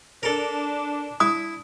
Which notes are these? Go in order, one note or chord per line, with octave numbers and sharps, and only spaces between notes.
D4 A4 A#4
E4 D#6